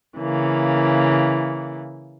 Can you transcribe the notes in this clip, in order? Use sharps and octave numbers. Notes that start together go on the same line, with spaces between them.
C#3 E3 A#3